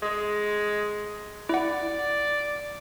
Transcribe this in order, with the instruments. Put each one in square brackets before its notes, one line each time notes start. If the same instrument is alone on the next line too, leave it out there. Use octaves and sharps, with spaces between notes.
[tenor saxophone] G#3
[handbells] E4 F#5 [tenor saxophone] D5